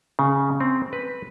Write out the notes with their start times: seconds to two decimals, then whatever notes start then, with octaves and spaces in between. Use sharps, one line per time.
0.19 C#3
0.60 C4
0.93 B4